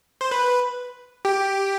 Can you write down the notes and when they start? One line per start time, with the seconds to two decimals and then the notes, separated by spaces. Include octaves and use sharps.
0.21 C5
0.31 B4
1.25 G4